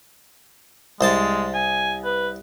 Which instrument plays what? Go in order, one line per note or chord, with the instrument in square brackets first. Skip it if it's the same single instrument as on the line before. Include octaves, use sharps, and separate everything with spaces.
[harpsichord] C2 C5 A5 [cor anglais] G#3
[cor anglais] G#5
B4